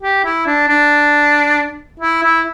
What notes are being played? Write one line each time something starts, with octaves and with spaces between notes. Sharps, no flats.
G4
E4
D4
D4
E4
E4